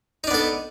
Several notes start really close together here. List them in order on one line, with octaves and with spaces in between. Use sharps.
D#4 D4 B3 A4